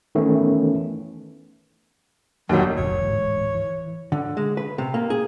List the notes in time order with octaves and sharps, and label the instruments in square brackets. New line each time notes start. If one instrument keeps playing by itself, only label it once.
[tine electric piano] D#3 E3 A3 B3 C#4
[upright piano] E1 D#2 [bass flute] F#3
[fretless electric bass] F1 D2 A#2 [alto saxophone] C#5
[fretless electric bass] D1 G#2 E3
E3
[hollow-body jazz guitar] D3
G#3
B4
C3
A#3
G#4